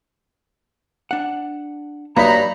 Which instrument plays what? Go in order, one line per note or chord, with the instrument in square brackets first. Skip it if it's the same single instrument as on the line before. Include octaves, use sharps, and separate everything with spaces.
[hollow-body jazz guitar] D4 F#5
[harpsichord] G2 D#4 [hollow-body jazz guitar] A#3 F#4 C#5 [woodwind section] A#5 B5